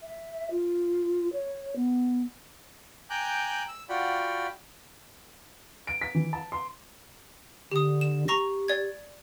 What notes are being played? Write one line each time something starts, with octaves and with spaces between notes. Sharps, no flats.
E5
F4
C#5
B3
G5 G#5 A#5 D6 F#6 G6
E6
F4 F#4 D5 F#5 G5 B5
D7
B6
E3
A5
C6
D3 G4 D#6
E7
G4 A#5 C#6 A#6
D5 G#6